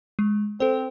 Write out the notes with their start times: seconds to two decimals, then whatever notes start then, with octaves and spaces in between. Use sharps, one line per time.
0.19 G#3
0.60 C4 A4 C5